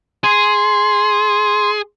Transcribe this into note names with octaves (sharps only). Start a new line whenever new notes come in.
G#4 C6